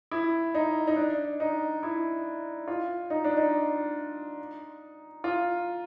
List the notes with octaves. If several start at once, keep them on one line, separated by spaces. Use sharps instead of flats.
E4
D#4
D#4
D4
D#4
E4
F4
D#4
D4
D#4
F4